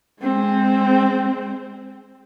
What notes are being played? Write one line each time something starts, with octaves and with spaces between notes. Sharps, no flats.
G#3 C4